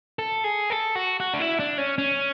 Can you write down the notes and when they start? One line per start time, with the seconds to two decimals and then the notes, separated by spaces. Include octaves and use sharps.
0.19 A4
0.44 G#4
0.70 A4
0.95 F#4
1.20 F#4
1.34 D4
1.40 E4
1.59 D4
1.78 C#4
1.98 C#4